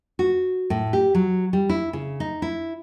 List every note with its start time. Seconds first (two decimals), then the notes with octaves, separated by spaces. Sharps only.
0.19 F#4
0.70 A2
0.93 G4
1.15 F#3
1.53 G3
1.69 E4
1.93 C#3
2.20 D#4
2.42 E4